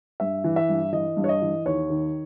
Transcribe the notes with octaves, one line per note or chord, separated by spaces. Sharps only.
G2 E5
E3
E5
G2
E3 D#5
G2
C#5
D#5
E3
D#2 C#5
D#3